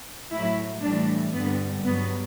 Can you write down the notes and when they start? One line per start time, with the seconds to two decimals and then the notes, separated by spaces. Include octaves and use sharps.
0.32 A2 F#3 E4
0.82 A2 E3 G3 D4
1.33 G2 D3 G3 B3
1.83 G2 F#3 B3